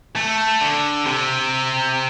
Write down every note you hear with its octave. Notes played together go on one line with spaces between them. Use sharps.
A3
D3
C3